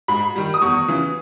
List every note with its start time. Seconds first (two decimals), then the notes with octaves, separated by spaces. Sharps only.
0.08 G#2 B5
0.36 D#3 G3
0.54 D#6
0.62 E2 C#6
0.88 C#3 E3